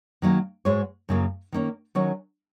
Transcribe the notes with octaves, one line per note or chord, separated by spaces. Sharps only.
D#3 F#3 A#3 C#4 A#4
G#2 G#3 F#4 C#5
F#2 C#3 F#3 A#3
D#3 A#3 C#4
D#3 F#3 C#4 F#4 C#5